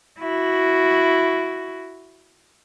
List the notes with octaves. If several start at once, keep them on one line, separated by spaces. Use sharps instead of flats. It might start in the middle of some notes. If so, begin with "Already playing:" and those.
E4 F#4